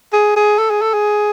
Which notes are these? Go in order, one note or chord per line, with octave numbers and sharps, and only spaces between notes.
G#4
G#4
A4
G#4
A4
G#4